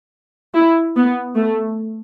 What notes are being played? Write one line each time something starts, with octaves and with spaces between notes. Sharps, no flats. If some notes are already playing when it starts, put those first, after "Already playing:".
E4
B3
A3